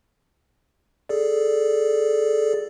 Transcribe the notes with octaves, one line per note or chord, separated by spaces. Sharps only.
G#4 A4 D5